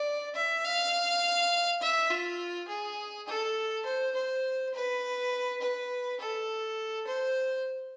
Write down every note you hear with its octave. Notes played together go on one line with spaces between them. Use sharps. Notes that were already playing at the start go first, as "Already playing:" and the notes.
Already playing: D5
E5
F5
E5
F4
G#4
A4
C5
C5
B4
B4
A4
C5